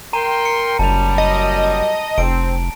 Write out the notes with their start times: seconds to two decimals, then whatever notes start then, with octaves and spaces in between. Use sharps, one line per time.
0.13 A#4 G5 A#5 C6 D#7
0.46 C#7
0.79 F#1 F#2 G3 A5 F7
1.18 D#5
2.18 F1 C4 D7